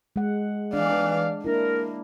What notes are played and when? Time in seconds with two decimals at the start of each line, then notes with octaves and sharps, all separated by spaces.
0.16 G#3 F#5
0.73 E3 D4 D5 F5
1.44 A#3 D4 E4 A#4